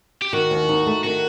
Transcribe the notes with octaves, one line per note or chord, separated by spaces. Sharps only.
G4
D#3 F#4
D#2
D#4
A3
D#3 F#4